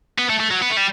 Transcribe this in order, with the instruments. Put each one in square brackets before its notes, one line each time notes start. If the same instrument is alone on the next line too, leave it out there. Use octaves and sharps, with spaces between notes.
[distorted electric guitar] B3
A3
A3
F#3
B3
A3
G3